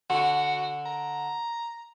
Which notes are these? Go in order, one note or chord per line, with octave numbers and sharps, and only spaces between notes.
D3 F#4
A#5